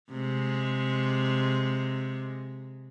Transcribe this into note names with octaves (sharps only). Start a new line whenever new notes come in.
C3 G#3